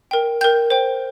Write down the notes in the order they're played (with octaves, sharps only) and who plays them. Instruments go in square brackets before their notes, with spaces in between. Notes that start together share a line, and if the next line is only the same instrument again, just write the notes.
[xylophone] A#4 G5
A#4 G5 G6
C5 G5